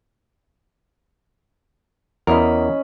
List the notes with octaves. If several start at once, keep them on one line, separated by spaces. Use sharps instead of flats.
E2 C#4 A#4 D#5 B5